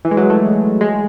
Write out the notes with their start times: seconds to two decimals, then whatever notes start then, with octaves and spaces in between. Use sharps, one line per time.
0.05 E3
0.11 G#3
0.17 F#3
0.30 A3
0.81 G#3